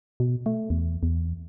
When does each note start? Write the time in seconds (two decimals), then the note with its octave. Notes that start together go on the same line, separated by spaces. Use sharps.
0.20 B2
0.46 A3
0.70 E2
1.03 E2